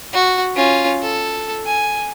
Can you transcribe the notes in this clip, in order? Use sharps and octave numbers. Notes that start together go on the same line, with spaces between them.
F#4
C#4 F4
A4
G#5